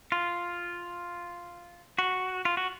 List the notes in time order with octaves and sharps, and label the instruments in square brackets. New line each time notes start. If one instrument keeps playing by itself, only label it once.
[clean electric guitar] F4
F#4
F4
F#4